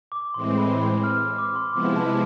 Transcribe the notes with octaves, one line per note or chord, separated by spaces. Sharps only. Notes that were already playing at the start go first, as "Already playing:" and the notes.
D6
A2 E3 G#3 C4 C6
B5
C6
F6
D6
C6
C3 F3 G#3 B3 E4 D6
A5